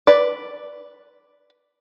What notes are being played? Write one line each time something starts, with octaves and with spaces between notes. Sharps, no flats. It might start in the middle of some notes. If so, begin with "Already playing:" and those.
B4 D5